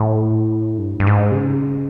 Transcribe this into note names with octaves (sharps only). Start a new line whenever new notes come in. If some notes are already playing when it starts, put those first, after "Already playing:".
Already playing: A2
G2
G2
G#2
C3
C#3